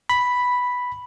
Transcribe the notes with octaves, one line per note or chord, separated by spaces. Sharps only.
B5